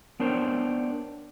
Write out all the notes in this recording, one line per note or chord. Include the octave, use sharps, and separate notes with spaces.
B3 D4 A#4 C5 C#5 G5